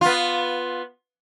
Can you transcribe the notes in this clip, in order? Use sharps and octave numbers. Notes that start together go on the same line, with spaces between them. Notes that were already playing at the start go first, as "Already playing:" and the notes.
B3 F4